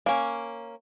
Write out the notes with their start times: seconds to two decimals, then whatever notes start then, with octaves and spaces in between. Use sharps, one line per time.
0.06 A#3 C#4